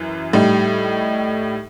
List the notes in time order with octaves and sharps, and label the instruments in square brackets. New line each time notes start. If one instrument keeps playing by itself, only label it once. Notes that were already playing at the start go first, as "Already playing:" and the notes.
Already playing: [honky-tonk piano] F#2 E3
A2 G3 D#4